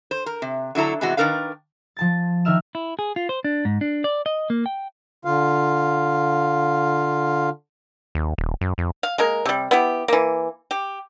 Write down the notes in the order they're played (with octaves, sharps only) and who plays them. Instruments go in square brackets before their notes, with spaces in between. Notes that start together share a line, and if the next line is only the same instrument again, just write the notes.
[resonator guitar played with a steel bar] C5
A#4
C3
D3 F#3 E4 A4 A#5
C3 E3 G#3 B3 F#4
D#3 G#3 D4 A#4 B4 F5
[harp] F3 A5 A6
D#3 A#4 E5 F6 E7
[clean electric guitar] E4
G#4
F4
C5
D4
G#2
D4
D5
D#5
A#3
G5
[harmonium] D3 F4 F5
[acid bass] D#2
D#1
F#2
F2
[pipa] F5
G#3 A#3 A#4
C3 G3
B3 E4 G4
E3 A#3
G4